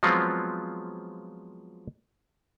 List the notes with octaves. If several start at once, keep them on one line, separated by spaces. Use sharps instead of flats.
F3 F#3 G#3 B3 C4 F4